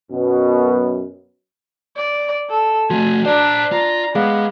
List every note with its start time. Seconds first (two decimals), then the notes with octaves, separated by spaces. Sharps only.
0.11 F#2 B2
1.96 D5
2.50 A4
2.90 F3 A3 F#4 G#5
3.26 D4 C5 D5 A#5
3.72 F4 A#5
4.15 G#3 B3 G#4 F5